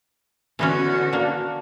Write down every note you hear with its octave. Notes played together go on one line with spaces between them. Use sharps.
D3 E3 B3 C#4 F#4
A#3 D4